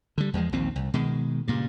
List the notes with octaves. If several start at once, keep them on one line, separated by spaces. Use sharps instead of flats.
D3 G3
E2 F3 G#3
A#1 D#2 A#2 C4
C2
B2 D#3 G#3
G2 A#2 C#3